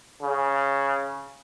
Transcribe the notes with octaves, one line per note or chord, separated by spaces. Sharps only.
C#3